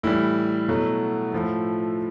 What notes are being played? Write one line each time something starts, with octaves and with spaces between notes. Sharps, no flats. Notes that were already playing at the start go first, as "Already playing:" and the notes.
A2 E3 G3 E4
B2 F#3 A3
A2 F3 A3